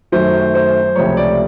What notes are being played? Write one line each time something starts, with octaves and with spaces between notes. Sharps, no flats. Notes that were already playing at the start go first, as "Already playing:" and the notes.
F#2 D#3 F#3 A3 C5
C5
C#2 C3 F3 A3 C#5
D5